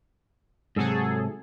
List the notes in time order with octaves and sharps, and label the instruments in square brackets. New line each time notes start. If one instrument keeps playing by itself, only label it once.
[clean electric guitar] G#2 C3 [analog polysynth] F#3 G#4 A4